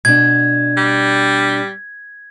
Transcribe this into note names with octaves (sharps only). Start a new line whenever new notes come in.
B2 D4 G#6
G3